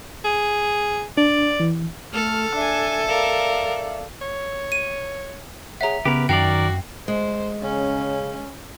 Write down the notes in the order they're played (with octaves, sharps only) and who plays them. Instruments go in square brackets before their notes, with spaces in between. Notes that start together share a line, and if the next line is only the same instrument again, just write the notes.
[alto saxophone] G#4
[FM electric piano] D4 [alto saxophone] D5
[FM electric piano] E3
[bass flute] A3 [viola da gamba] A4 [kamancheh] F6
[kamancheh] D4 G#5 [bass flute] E5
[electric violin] A#4 [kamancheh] D5 F5
[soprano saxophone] C#5
[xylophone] D#7
[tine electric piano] G#4 C#5 F#5 [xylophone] E5 A#5
[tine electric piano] C#3 B3 [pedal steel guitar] G4 A#4 [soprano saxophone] B4
[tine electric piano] F#2 C7 [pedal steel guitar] D#3 A#4 D5 [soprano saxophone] F#4 [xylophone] G5
[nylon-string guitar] G#3 [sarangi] C5
[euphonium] C#3 [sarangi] C#4